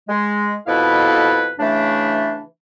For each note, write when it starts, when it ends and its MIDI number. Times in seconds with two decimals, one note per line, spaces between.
0.09 0.55 56
0.67 1.51 41
0.67 1.51 47
0.67 1.51 64
0.67 1.51 69
0.67 1.51 71
0.67 1.51 77
1.60 2.42 49
1.60 2.42 52
1.60 2.42 57
1.60 2.42 62